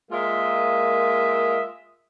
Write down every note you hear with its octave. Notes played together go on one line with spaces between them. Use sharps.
G#3 A#3 F4 A#4 D#5 E5